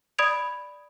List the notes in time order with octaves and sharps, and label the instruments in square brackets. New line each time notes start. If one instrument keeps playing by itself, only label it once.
[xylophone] D5 B5 D#6 G#6 D7 F7